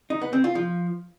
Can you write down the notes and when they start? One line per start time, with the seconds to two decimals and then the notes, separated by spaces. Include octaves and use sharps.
0.10 D#4
0.21 B3
0.33 C4
0.44 F4
0.55 F3